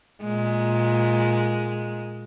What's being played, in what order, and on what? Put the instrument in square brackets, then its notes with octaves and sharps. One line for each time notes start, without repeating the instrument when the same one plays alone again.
[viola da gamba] A#2 G#3